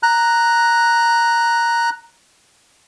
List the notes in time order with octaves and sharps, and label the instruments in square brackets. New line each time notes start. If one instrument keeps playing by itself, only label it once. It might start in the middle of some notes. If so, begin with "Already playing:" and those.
[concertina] A#5 F#6